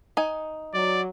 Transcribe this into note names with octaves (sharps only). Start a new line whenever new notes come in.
D#4 G#5
F#3 D5